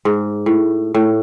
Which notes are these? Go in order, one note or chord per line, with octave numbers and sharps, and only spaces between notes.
G#2
A2
A2